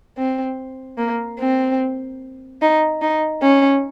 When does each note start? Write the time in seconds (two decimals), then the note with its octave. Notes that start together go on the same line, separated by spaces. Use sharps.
0.18 C4
0.98 A#3
1.39 C4
2.62 D#4
3.02 D#4
3.42 C#4